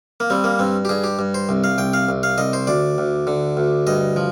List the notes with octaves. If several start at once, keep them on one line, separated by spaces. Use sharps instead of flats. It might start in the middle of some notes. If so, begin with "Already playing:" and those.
A#3
G3 C4
A#3
G2 C4
G4
G2 G#4
G4
G2
C5
C2
F5
C2 G5
F5
C2
F5
C2 D#5
C5
D2 D5
D2
D3
D2
G2 D#5
F3